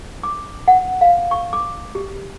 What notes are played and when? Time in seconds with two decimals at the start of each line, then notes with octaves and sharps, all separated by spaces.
0.23 D6
0.68 F#5
1.01 F5
1.31 C#6
1.53 D6
1.95 G4